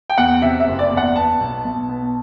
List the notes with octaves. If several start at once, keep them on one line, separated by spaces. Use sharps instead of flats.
G5
E2 F#5
C3 E5
E5
F#1
D5
E2
F#5
B3 A5
B1
B1
B3